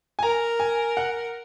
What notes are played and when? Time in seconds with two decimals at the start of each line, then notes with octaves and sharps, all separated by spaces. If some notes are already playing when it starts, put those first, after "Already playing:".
0.19 G#5
0.23 A#4 A#5
0.60 G#5
0.97 F#5